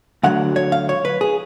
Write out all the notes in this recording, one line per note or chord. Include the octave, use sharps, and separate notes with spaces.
D2 D3 F#3 F#5
C#5
F5
C#5
B4
G#4